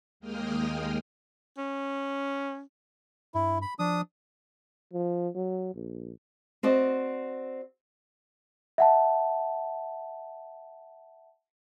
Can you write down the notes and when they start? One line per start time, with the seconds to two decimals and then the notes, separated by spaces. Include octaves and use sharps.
0.20 D#2 G#3 A#3 G5 D#6 F6
1.58 C#4
3.34 G2 E4
3.62 B5
3.79 F3 D4 D#6
4.93 F3
5.35 F#3
5.75 A#1
6.63 C4 F#4 D5 D#5
8.78 E5 F#5 A5